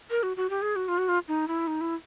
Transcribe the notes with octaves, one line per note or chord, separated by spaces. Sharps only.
A#4
F#4
F#4
G4
G#4
F#4
F4
F#4
F4
D#4
E4
D#4
E4